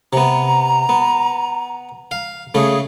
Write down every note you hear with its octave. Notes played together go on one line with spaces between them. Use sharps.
C3 B3 A#5
B3
F5
C#3 A3 G#4